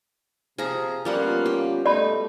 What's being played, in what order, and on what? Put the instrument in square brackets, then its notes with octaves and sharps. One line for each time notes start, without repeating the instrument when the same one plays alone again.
[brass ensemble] C3 [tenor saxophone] F3 [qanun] G#4 A#5
[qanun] F3 G3 F#5 [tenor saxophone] A#3 [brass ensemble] B3 C#4 F4
[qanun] G4
[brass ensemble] B2 A3 [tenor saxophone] D#4 [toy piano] D5 B5